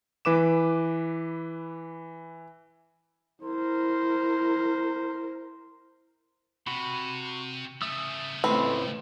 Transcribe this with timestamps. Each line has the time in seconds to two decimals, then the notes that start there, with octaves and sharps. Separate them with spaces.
0.25 E3 B4 D6 E7
3.43 E4 A#4 C5
6.67 C3 F#4 B5
7.82 C#3 A3 E5 D#6 E6
8.44 C#2 A2 C4 A4 B4 B5